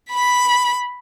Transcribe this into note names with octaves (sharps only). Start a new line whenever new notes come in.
B5 B6